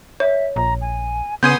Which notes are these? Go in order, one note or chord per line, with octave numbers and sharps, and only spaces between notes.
C#5 E5
A#1 A#5
G#5
C#3 B3 G#5 C6 D#6 G6 G#6 D#7